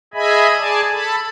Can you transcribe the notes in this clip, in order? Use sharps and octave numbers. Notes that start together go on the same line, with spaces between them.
G#4 D#5 E5 G#5 B5
G#4 D5 G#5 A5
A4 A5 B5